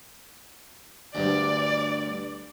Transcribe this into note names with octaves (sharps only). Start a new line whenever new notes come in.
D2 G2 D5